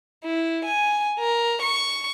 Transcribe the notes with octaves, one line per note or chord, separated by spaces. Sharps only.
E4
G#5
A#4
C#6